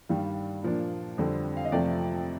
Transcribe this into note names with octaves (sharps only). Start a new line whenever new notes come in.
G2 D#3 G3 F5
A#2 F3 A#3 D4
F2 D3 G3 C4
F5
D#5
F2 C3 F3 A3 D5